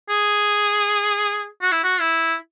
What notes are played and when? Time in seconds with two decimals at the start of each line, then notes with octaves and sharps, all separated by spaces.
0.09 G#4
1.62 F#4
1.72 E4
1.83 F#4
2.00 E4